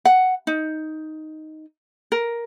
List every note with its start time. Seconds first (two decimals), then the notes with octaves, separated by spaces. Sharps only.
0.05 F#5
0.47 D#4
2.12 A#4